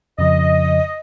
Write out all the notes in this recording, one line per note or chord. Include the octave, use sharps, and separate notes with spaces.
F2 C#3 F3 D#5